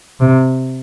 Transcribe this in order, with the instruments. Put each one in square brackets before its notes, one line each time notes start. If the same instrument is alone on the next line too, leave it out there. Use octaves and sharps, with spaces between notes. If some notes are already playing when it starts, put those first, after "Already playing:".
[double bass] C3